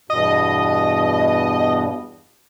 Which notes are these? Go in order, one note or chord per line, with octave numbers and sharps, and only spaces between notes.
E2 G2 B2 D#5